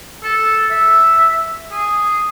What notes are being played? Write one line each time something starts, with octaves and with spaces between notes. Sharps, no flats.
A4
E5
G#4